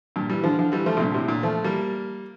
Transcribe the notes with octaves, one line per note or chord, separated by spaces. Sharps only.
G2 A#2
E3 G3
D3 F3
D3 F3
E3 G3
F3 A3
C3
G2 A#2
D3
A2 C3
A#2 D3
F3 A3
G3 A#3